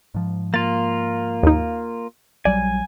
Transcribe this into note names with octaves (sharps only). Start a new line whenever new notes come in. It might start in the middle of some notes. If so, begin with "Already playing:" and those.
G#2 F3
A#3 F4 A6
D#2 D#4
A#1 F#3 G3 D5 G#5